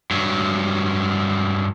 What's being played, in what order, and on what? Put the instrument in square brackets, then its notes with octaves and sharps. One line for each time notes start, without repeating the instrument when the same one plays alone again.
[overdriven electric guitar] G2 F#3